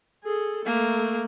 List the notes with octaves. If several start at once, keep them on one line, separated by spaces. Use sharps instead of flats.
G#4 A4
A3 A#3